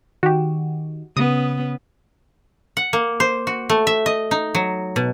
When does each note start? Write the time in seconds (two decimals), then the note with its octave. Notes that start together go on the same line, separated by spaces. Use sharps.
0.23 D#3 F#4 G4
1.17 C#3 B3 C#4 D#6
2.77 F#5
2.93 A#3
3.20 C5
3.47 F#4
3.69 A3
3.87 E5
4.06 D#5
4.31 D#4
4.55 F#3
4.96 B2